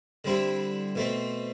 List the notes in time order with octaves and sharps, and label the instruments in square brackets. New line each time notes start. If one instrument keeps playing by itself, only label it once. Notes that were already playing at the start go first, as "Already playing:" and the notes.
[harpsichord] D3 G3 C4 E4
B2 A3 C4